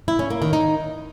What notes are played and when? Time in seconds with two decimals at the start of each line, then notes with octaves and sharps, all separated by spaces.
0.08 E4
0.19 C#4
0.30 A#3
0.42 D#3
0.53 D#4